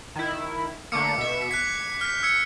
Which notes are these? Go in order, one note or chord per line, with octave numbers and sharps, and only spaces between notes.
D#3 E4
D3 A3 A#3 D6 C#7
B2 E5
F#6 G#6 B6
F6 G6 B6
E6 G#6 C#7